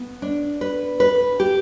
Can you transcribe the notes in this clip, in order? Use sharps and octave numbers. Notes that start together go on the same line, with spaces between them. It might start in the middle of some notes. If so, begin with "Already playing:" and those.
Already playing: B3
D4
B4
B4
G4